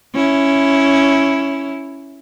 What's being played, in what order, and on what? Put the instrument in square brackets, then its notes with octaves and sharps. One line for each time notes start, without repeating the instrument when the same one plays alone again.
[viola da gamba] C#4 E4